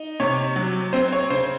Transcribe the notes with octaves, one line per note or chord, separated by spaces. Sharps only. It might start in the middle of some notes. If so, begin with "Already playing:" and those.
Already playing: D#4
C3 C#5
F#3
C4 C5
C#5
C#3 C5